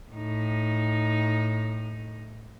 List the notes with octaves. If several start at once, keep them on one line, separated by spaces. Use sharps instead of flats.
A2 D#4